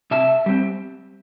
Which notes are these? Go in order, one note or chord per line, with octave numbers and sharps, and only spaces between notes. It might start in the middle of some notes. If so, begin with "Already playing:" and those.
C3 E5 A5
G3 C4